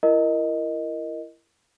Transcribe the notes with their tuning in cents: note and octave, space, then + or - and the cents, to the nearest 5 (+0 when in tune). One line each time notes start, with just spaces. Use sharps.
E4 +25 A#4 +0 D#5 +0